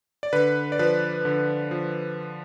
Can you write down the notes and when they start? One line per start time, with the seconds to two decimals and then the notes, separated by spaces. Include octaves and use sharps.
0.23 D5
0.33 D3 B4
0.72 D5
0.79 F3 B4
1.25 D3
1.71 F3